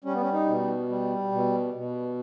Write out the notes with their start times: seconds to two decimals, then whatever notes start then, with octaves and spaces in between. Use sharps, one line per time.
0.04 G3 C#4
0.13 B3
0.21 C#4
0.33 D#4
0.47 B2
0.89 G3
1.32 B2
1.74 B2